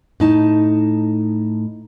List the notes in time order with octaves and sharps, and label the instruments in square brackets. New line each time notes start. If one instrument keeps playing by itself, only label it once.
[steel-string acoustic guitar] A2 D#4 A5